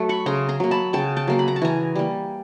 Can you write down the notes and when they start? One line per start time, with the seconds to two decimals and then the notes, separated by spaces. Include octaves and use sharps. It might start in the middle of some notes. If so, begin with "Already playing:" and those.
Already playing: F#3 A3
0.09 B5 C#6
0.26 C#3 A#5 C6
0.49 A#5 C6
0.60 F#3 A#3
0.71 A5 B5
0.93 C#3 G5 A5
1.17 G5 A5
1.27 F#3 A#3
1.39 B5
1.48 A#5
1.56 A5
1.62 E3 G#5 A#5
1.96 G3 A#3